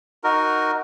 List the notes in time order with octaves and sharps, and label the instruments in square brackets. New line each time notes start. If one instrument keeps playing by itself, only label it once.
[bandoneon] D#4 F#4 A#4